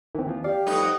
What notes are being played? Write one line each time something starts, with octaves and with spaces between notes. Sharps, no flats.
D#3 E3 C4
D#2 E3 F3
G4 D5 F5
F2 G3 A3 D#4 B4
F#5